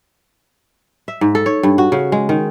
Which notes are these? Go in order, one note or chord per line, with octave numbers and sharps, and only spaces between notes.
E5
G#2
A4
C#5
G2
F#4
C#3
G#3
D#3